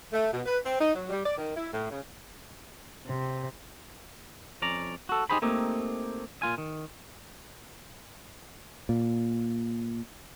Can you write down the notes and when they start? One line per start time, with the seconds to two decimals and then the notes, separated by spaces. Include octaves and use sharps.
0.13 A3
0.32 B2
0.46 B4
0.64 C4
0.79 D#4
0.95 F#3
1.10 G3
1.25 D5
1.37 D#3
1.56 E4
1.72 A2
1.90 C#3
3.06 C3
4.62 F2 C#4 D5 A#5
5.09 F#4 A4
5.30 D#4 G4 G#4 C5 B5
5.42 A3 A#3 C4 D#4 G4
6.42 A#2 F4 G#5
6.58 D#3
8.89 A#2